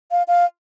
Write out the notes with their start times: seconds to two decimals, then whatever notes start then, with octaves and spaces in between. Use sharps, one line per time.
0.11 F5
0.28 F5